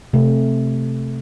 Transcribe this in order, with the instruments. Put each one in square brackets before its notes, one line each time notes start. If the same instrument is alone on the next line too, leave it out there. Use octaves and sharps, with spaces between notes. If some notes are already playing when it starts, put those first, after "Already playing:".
[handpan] C3 A3